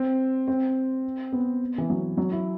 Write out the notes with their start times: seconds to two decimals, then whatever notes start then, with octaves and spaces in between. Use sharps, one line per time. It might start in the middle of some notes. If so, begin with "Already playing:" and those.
Already playing: C4
0.48 C4
1.32 B3
1.78 E3
1.90 F#3
2.17 F#3
2.32 E4